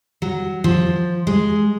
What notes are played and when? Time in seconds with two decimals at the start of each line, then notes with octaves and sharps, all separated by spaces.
0.22 F#3
0.64 F3
1.27 G#3